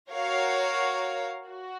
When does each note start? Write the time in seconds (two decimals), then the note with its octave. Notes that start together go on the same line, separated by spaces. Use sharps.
0.11 F#4 A#4 C#5 F5
1.48 F#4